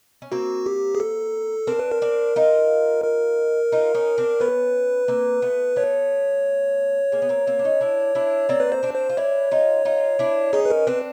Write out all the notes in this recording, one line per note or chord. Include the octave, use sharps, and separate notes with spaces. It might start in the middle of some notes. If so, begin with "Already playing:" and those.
C#4
A#3 C4 F#4
G4
G#4
A4
C4 D4 A#4
B4
A#4
C4 D4
D#4 F4
A#4
D#4 F4
C#4 D#4
C4 D4
B3 C#4 B4
A#3 C4
A3 B3
A3 B3 C#5
G#3 A#3
B3
A#3 C4
A#3 C4
D4
C#4 D#4
D4 E4
D4 E4
A#3 C4 D5
B4
C5
C4 D4
C5
F4
D4 E4 C#5
D#4 F4
D#4 F4
D4 E4
C#4 D#4 G#4
B4
A#4
C4 D4 B4